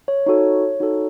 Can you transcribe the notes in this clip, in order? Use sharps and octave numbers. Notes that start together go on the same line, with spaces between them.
C#5
D#4 F#4 A4 C#5
D#4 F#4 A4